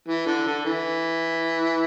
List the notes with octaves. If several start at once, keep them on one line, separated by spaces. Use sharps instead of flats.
E3
D3
D3
E3